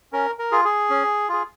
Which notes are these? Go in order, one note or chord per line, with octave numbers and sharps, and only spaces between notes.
C#4 A#4
A#4
F4 G#4
G#4
C#4
F4 G#4